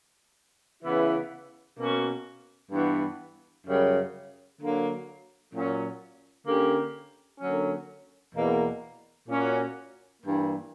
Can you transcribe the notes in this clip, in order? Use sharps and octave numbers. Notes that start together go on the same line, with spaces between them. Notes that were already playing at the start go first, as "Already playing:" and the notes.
C#3 E3 B3 E4
B2 A#3 C#4 F#4
G2 E3 B3
F#2 C#3 G3 C#4
D3 F#3 A#3
A#2 F#3 C#4
D3 A#3 C#4 G4
D3 F#3 A#3 C#4
E2 B2 A#3
A#2 A#3 C#4 F#4
G2 E3 A#3